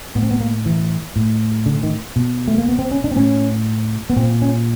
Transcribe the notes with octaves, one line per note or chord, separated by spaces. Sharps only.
A2 B3
C4
B3
A#3
E3
A2
D3
D#3
B2
A3
A#3
B3
C4
C#4
D4
C4
A2 C#4
B3
A#2 C4
C#4